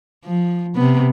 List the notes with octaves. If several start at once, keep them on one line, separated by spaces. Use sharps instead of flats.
F3
C3 B3